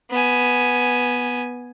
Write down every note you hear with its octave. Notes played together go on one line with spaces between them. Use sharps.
B3 G#5